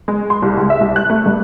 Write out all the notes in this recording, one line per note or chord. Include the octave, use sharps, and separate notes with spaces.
G#3
C6
C2
C#2
E5
C2
F#6
A3
G2